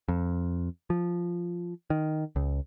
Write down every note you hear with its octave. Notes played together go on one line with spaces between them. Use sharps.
F2
F3
D#3
C#2